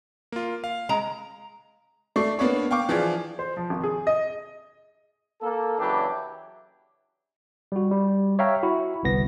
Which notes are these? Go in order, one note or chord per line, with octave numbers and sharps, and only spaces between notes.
A#3 F4
F5
G#3 A#5
A3 D5 C#6 C7
A#3 B3 D4 C#5
F5 G5 C#6 D6
E3 F3 F4 G#4 D5
C5
F3
G#1
G#4
D#5
A#3 A4
C#3 E3 F#3 D4 E4 G4
G3 F#4
G3
C#5 E5 F5 G5 A#5
E4 F#4
G1 C2 B3 A#6